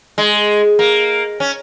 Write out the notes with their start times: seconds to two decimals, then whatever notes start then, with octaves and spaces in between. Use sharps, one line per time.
0.18 G#3
0.79 A#3
1.40 C#4